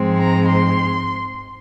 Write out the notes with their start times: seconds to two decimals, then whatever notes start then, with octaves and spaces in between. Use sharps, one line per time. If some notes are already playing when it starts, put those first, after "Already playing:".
Already playing: G#2 F3 G#3 C4
0.18 A#5
0.48 C6